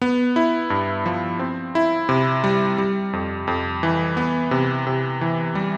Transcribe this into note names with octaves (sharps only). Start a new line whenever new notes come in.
B3
E4
G2
F3
C4
E4
C3
G3
G3
F2
F2
E3
B3
C3
C3
E3
G3